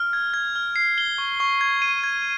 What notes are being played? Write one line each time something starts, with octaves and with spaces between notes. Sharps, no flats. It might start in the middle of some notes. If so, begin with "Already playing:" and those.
Already playing: F6
G#6
G#6
F6
C7
G7
C#6
C#6
G#6
D#7
G#6